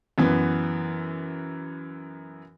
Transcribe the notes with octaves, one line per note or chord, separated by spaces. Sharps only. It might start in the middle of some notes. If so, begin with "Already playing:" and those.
F#2 E3 B3